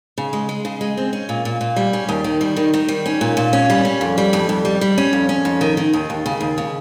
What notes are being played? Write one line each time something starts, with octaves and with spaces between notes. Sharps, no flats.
C#3
G#3
G#3
C#3
G#3
C4
C#4
A#2
A#2
A#2
G3
C#4
D#2
D#3
G3
D#3
D#3
G3
C#4
A#2
A#2
C#4
G3
C#4
F2
G3
F2
F2
G3
G3
C#4
F2
C#4
F2
D#3
D#3
D#2
D#2
C#3
D#2
C#3